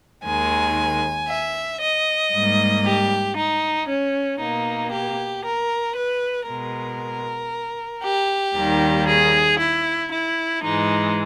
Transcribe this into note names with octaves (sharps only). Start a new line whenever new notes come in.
D#2 D#3 G#3 G#5
E5
D#5
G#2 G3 A#3
G4
D#4
C#4
B2 A#3 D#4
G4
A#4
B4
B2 G#3 A#4
G4
D#2 D#3 G3 A#3
G#4
E4
E4
G#2 E3 G#3 D#4